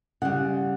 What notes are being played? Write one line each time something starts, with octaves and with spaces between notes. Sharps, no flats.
C#3 G3 F#5